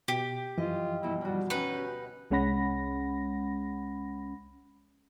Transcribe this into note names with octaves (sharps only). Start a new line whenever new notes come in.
B2 G4
F#2 E3 F3 F4 D#5
G2 B2 E4
D2 G3 F#4
C#4 D#4 B4 G5
G4
C2 G#3 C#4 F#5 B5 A#6